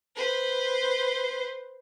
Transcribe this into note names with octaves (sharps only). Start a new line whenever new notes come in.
B4 C5